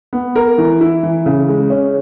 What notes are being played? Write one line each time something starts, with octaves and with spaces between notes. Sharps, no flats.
B3
A#4
E3
E4
E3
C#3
G#3
C#4